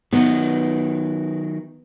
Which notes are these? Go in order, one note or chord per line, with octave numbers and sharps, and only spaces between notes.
D#3 F#3 B3 D#4